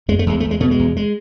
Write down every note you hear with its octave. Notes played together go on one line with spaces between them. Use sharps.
F#2 G#3
A3
E2 G#3
E2 A3
G#3
B2 A3
G#3
E2
G#3